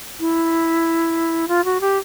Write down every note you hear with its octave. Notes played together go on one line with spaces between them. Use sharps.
E4
F4
F#4
G4